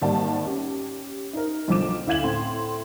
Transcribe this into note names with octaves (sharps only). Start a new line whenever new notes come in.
G#1 G3 A#3 D5 F#5 A5
C#4 G4
D#4 A#4
B1 D3 F3 D6 E7
D2 E4 F5 G#6 E7 F#7
A2 C4 C6